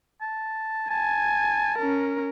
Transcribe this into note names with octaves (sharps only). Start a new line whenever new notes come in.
A5
G#5 A5
C#4 A#4